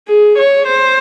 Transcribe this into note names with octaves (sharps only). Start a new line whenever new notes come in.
G#4
C#5
C5